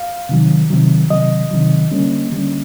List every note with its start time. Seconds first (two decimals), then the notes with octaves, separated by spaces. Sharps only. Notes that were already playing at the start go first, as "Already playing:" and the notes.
Already playing: F5
0.29 C3 D#3 F#3
0.70 C3 D#3 F#3
1.10 C3 D#3 F#3 D#5
1.51 C3 D#3 F#3
1.91 D3 G3 A#3 C#4
2.32 D3 G3 A#3 C#4